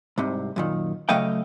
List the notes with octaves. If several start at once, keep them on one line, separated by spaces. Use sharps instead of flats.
C2 G#2 C3
F#2 A#2 D#3
C#3 F#3 A3 D#5 F5 G5